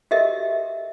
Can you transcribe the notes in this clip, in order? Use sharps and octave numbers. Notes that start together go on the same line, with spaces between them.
F#4 G4 A4 A#4 D#5 E5